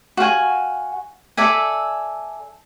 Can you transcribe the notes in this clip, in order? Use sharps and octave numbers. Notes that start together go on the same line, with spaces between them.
F#4 F5 G5 G#5
A4 D5 E5 G#5